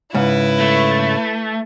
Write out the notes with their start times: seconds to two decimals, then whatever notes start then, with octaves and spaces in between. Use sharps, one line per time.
0.15 G#2 C#3 E4 B4
0.60 A3